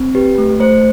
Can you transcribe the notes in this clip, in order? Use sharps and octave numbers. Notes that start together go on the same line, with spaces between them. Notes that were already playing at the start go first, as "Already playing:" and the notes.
Already playing: C4
G4 B4
A3
A3 C5